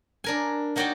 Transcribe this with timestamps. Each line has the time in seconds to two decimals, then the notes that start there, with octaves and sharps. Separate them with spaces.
0.24 D4 A#4 G#5
0.76 A#3 D#4 F#4 C#5 D5 G5